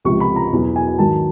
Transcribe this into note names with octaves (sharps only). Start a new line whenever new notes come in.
C#2 C3 F3 C#6
B5
A#5
E2 B2 F#3
G#5
G#2 D#3 F#3 A5